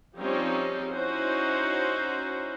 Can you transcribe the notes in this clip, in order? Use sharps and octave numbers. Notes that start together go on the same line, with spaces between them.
F3 G3 C4 C#4 D#4 G4
C#4 D#4 E4 F#4 C5